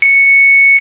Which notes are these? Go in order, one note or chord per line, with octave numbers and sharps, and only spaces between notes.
C#7